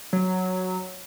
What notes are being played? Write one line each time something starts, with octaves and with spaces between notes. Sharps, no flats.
F#3